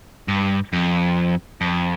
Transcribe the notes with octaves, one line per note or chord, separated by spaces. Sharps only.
G2
F2
F2